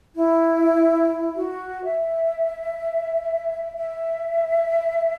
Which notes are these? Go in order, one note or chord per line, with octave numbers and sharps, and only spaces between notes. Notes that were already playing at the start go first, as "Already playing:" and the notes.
E4
F#4
E5
E5